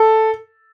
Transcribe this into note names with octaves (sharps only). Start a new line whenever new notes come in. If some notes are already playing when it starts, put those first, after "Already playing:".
Already playing: A4